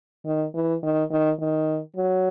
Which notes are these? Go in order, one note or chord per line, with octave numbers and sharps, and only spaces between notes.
D#3
E3
D#3
D#3
D#3
F#3